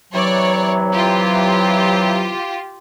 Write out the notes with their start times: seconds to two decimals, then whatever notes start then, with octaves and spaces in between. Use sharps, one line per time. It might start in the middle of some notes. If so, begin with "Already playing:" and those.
0.13 C3 E3 F#3 C#5 D5
0.93 F4 G4